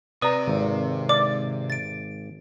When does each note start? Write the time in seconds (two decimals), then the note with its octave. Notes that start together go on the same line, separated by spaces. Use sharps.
0.22 C3 B4 D5 A#5 D#6
0.48 G#1
1.09 D5 D6
1.70 A6 D7